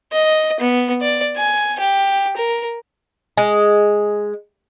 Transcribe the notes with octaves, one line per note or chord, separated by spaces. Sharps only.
D#5
B3
D5
G#5
G4
A#4
G#3